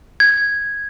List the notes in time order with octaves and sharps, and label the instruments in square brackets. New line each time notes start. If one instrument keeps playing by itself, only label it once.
[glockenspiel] G#6